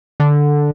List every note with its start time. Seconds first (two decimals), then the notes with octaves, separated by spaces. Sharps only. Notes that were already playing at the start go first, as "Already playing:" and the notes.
0.20 D3